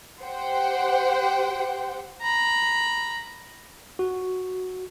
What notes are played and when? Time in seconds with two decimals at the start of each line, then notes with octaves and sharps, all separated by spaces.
0.21 G4 C5 F#5 G5
2.22 A#5 B5
3.99 F#4